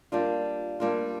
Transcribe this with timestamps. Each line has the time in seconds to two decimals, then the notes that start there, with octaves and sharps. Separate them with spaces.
0.12 G3 A#3 D4 F4
0.80 G3 A#3 D4 F4